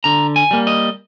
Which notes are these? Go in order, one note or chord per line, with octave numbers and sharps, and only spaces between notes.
D3 A#5
G#5
G3 A#3
D#5